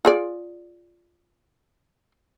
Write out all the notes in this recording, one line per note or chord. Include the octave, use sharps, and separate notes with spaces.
F4 G#4 D5